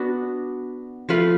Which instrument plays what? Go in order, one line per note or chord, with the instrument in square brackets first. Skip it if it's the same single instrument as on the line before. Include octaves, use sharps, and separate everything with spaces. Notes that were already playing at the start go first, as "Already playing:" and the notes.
Already playing: [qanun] B3 D4 F#4
F3 A3 F4 B4